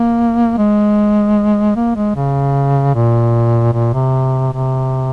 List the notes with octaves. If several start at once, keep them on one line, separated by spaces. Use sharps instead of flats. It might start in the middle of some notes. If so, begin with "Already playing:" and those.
Already playing: A#3
G#3
A#3
G#3
C#3
A#2
A#2
C3
C3